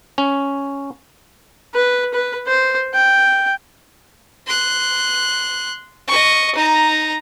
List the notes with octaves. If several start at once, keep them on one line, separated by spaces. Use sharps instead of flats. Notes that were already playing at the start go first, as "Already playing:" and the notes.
C#4
B4
B4
C5
G5
C6 F#6
D#5 C#6
D#4 A#5